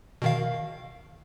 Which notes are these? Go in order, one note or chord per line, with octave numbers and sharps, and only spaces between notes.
B2 D#3 F5